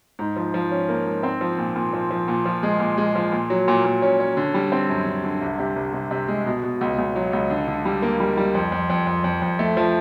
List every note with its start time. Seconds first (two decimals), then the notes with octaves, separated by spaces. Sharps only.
0.19 G#2
0.36 F3
0.54 F3
0.71 C#4
0.89 A#3
1.06 G#2
1.23 C4
1.41 F3
1.58 A#2
1.76 A#2
1.93 F3
2.11 F3
2.28 A#2
2.45 F3
2.63 G#3
2.80 A#2
2.98 G#3
3.15 F3
3.32 A#2
3.50 F#3
3.68 A#2
3.85 A#2
4.02 C#4
4.20 C#4
4.37 D3
4.54 G3
4.72 C4
4.89 F#2
5.06 D3
5.24 D3
5.41 C2
5.59 C3
5.76 C2
5.93 C3
6.11 C3
6.28 G#3
6.46 B2
6.63 B2
6.81 C#2
6.98 C#2
7.16 F#3
7.33 C#2
7.50 D3
7.68 D3
7.85 G3
8.02 A#3
8.20 G3
8.37 G3
8.55 F2
8.72 F2
8.90 F2
9.07 F2
9.24 F2
9.42 F2
9.59 A3
9.77 F3